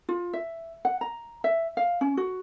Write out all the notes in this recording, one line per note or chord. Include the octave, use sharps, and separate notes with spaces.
F4
E5
F#5
A#5
E5
F5
C#4
F#4